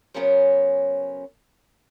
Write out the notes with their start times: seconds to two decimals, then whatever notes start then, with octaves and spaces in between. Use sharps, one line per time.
0.14 C#3 F#3 B3 C#4 A#4 C5